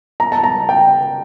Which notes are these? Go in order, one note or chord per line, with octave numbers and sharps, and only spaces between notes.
A#5
A5
A#5
G5